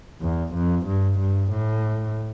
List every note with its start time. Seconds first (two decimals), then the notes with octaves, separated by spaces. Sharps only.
0.21 E2
0.54 F2
0.86 G2
1.19 G2
1.51 A2